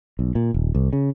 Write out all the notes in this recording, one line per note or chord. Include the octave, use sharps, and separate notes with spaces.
B1
A#2
D#1
C2
C#3